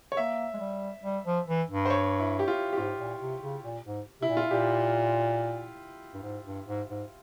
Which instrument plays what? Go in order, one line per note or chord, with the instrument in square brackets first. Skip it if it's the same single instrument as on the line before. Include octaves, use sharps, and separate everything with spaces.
[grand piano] C#5
[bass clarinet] A#3 [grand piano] E5
[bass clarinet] G#3
G3
G3
F3
E3
G2
[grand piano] C5
C#5
E4
G4
F4
G4
[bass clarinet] G#2 [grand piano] F4
[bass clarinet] A#2
C3
C#3
A#2
G#2
[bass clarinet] C3 [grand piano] E4
[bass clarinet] A#2
[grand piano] F4
[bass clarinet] A#2 [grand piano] G4
[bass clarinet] G2
G#2
G2
G#2
G#2